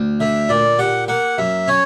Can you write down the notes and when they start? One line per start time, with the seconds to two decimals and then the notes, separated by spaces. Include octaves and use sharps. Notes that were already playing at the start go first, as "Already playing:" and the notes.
Already playing: D2
0.20 D3 E5
0.49 A#2 D5
0.79 G4 F#5
1.08 A#3 F#5
1.38 F#2 E5
1.68 C#4 C#5